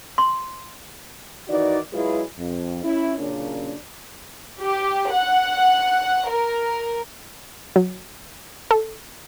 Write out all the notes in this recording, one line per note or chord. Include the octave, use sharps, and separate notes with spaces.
C6
D#3 E3 D#4 F#4 D5
F#3 G#3 E4 F4 G#4 B4
F2
C#4 E4
F#2 A#2 C#3 C#4 D4
G4
F#5
A#4
F#3
A4